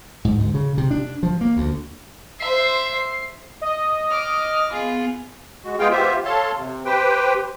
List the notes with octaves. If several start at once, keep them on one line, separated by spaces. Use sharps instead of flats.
G#2
D2
C#3
C3
D4
F3
A#3
D2
C5 E5 C7
D#5
D6 F6
B3 F4 G#4
G#3 F#4
G#3 B3 F4 G#4 F5 G5
B3 F4 G4 C5 E5
A4 C#5 F5 A5 C6
C3
G4 B4 C5 G5